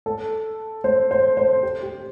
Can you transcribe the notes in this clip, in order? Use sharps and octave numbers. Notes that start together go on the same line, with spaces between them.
A4
C5
C5
C5
G4
G4